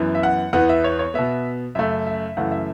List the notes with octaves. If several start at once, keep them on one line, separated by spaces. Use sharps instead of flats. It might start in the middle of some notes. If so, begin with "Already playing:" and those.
Already playing: F#2 E3 B3
E5
F#5
E2 E3 B3 F#5
E5
C#5
C#5
B2 B3 E5
F#2 C#3 A3 E5
E5
F#2 C#3 E3 A3 F#5
E5